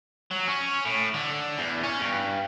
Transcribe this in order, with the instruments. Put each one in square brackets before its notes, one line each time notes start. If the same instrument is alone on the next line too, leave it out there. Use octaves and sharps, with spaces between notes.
[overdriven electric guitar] F#3
C#4
A2
D3
E2
C#4
G2